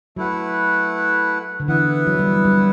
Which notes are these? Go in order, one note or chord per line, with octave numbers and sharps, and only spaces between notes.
F#3 A3 E4 B4 F#5
D3
E3 B3 E4 B4 F#5
F#3
G3
F#3
G3